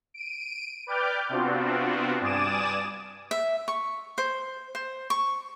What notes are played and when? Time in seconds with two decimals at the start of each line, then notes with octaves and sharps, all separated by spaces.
0.14 D7 D#7
0.87 B4 D5 G5 D6 F6 G6
1.29 C3 B3 C4 D4 F4 F#4
2.21 G2 D5 G#5 D6 D#6 E7
3.31 E5
3.68 C#6
4.18 C5
4.75 C5
5.10 C#6